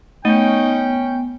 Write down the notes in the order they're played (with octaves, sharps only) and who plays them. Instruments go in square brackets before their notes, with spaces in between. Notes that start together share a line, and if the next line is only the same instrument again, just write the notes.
[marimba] A3 [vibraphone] B3 [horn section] C#4 G5 [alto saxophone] D#4